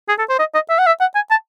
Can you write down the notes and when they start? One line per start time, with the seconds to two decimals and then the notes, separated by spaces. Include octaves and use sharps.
0.09 G#4
0.19 A4
0.29 C5
0.39 D#5
0.54 D#5
0.70 E5
0.79 F#5
0.87 E5
1.01 F#5
1.15 G#5
1.31 A5